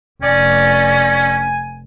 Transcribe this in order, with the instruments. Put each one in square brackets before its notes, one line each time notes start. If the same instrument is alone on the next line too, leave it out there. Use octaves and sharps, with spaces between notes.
[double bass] F1 [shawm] C#4 [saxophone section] D5 [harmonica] G#5